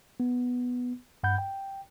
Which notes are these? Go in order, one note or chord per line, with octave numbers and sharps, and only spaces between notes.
B3
G2 F#5 B5 G6
G5